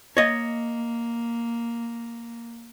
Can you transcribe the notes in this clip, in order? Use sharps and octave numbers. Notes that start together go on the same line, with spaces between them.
A#3 C#5 D#5